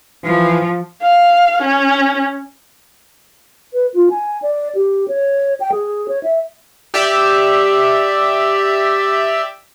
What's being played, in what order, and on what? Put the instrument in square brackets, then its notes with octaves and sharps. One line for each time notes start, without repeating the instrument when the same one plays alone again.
[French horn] E3 [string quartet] F3
[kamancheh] F5
C#4
[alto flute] B4
F4
G#5
D5
G4
C#5
G5
G#4
C#5
E5
[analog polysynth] G4 D5 E5